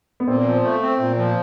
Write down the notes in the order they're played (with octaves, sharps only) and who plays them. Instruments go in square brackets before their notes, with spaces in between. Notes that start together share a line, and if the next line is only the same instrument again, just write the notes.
[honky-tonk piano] B3
[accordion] A#2 [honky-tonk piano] C4
[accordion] F3
A3
C4
A#2
F3